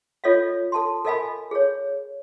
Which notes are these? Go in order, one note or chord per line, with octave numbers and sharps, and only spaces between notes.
F4 A4 C#5 D#5 F5
A4 A5 C6
A4 A#4 D#5 F5 G#5 B5
G#4 C#5